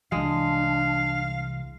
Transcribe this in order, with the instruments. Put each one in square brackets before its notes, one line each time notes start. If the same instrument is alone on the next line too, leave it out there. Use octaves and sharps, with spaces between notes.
[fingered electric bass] C2 E3 [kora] G#3 [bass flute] D4 [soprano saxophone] F5